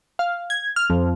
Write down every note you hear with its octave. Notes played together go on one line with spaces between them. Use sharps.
F5
G#6
F6
F2